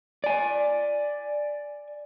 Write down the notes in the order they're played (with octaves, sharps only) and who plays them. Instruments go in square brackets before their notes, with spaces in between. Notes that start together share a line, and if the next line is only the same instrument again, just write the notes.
[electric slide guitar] D5 G#5